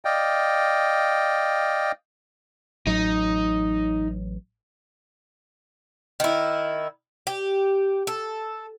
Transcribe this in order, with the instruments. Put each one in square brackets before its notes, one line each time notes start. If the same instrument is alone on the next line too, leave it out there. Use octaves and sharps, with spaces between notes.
[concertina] D5 D#5 F5 G5
[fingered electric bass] A1 F#3 [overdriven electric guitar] D#4
[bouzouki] D#3 E4
G4
A4